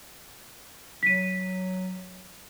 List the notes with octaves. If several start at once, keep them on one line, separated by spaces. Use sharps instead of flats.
F#3 B6 D#7